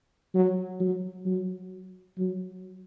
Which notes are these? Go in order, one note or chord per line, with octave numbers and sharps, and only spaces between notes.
F#3
F#3
F#3
F#3